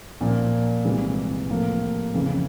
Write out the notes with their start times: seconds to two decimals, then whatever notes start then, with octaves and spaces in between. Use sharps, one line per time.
0.21 A#2 F3 A#3
0.85 C2 C3 E3 G#3
1.50 A2 F3 A#3
2.14 F2 C#3 E3